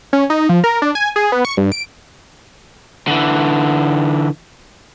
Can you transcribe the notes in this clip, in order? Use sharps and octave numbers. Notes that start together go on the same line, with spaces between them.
C#4
D#4
F3
A#4
D4
G#5
G#4
B3
C#6
G2
D7
D3 E3